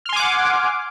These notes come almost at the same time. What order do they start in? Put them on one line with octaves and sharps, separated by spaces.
F6 C6 G#5 D6 F#5